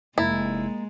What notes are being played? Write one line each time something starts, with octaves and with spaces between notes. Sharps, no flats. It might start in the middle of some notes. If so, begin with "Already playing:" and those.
F1 G#3 A#3 E4 A#5 A6